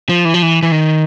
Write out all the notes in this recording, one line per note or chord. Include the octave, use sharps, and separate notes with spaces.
F3
E3
F3
E3
E3
D#3